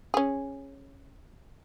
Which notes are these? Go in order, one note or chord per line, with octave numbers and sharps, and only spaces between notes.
C#4 G#4